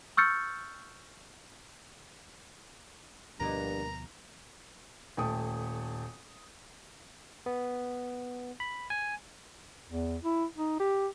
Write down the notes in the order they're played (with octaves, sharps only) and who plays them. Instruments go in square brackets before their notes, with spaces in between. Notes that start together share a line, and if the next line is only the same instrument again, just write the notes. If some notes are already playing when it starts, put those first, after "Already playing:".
[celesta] C#6 E6 F6 G6 A6 C#7
[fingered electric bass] D2 B2 F3 [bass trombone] G2 [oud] A#3 B3 D#5 [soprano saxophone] A#5
[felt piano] D#1 A3 G5 D#6
[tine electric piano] B3
B5
G#5
[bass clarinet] E2
E4
D#4
G4